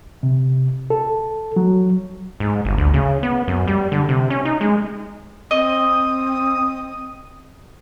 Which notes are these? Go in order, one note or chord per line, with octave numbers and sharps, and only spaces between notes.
C3
A4
F#3
G#2
G1
D2
C#3
B3
F#2
G3
D3
C3
C#4
D#4
G#3
C4 D#5 D#6